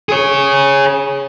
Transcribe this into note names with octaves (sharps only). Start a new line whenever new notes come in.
G#4 C#5